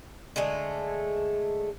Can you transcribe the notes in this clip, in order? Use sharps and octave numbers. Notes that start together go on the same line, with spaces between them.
D3 G#3 A3 G#4